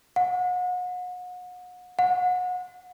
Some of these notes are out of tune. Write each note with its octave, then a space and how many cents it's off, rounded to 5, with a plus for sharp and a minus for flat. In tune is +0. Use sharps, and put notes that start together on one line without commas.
F#5 -35
F#5 -30